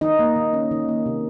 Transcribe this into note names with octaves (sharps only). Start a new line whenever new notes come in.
D#3 D#4 D#5
A#3
D#3
C#4
D#3
A#3
C3